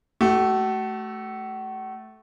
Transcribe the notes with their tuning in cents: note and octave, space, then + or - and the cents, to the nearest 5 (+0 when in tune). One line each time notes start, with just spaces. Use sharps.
A3 -10 F#4 +40